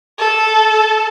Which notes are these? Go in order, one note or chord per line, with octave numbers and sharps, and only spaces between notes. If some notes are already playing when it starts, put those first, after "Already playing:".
A4